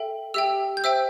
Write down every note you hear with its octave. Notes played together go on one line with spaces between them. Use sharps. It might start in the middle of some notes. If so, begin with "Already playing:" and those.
Already playing: A4 E5 G5
G4 E5 G5 E6
G6
C5 E5 G5 E6